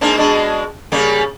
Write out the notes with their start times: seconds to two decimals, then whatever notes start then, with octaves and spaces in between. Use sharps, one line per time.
0.01 G#2 A#3 D4
0.18 B2 G#3 D4
0.92 C#3 G3 A#3